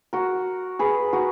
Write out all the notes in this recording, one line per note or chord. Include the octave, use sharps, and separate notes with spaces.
F#4 A#4
G#4 B4
F#4 A#4